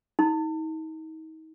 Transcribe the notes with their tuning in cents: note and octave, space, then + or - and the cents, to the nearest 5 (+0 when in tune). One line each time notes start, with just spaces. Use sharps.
D#4 +35